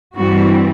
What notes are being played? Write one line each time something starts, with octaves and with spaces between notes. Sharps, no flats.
G2 E3 G3 C4 F#4